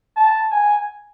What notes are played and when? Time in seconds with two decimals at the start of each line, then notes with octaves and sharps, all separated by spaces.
0.17 A5
0.52 G#5